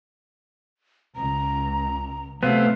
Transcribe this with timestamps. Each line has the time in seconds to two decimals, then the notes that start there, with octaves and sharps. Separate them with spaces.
1.16 C#2 A#5
2.43 C3 F#3 A3 B3 F5